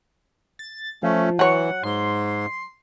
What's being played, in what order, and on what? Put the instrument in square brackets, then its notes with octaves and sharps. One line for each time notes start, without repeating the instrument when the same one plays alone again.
[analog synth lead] A6
[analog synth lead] F3 [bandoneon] A3 C#4
[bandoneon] E3 [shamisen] F#3 C#5 [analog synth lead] F#5
[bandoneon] G#2 [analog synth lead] C6